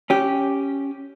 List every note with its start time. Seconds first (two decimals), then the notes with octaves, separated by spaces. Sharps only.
0.10 C#4 G4